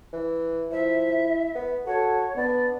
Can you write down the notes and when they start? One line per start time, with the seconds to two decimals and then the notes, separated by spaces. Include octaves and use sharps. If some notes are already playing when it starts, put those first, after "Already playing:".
0.13 E3
0.72 F3 E4 E5
1.55 B3
1.86 F#4 A4 C#5
2.36 B3 D4 D5